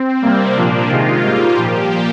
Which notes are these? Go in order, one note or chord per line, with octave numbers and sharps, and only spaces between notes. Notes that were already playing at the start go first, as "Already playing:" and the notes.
Already playing: C4
C3 G3 A#3
A#2 F3 A#3 D4
C3 D#3 G#3 F4
G#2 G3 A#3 F4
A#2 F3 A#3 G4